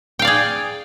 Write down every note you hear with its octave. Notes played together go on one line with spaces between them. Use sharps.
G#4 D5 F5 G5